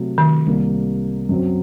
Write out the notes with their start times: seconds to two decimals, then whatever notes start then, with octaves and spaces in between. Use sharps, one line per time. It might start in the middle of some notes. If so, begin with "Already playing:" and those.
Already playing: C3 F#3 A3
0.18 D#3
0.46 C2 C3 G3 A#3
1.29 F#2 F#3 C4